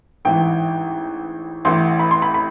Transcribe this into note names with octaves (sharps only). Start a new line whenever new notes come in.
A1 G#2 E3 G5
A1 A2 E3 C6
B5
C6
B5
B5